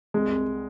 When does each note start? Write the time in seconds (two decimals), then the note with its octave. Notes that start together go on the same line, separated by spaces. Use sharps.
0.14 C2 G#3
0.30 C2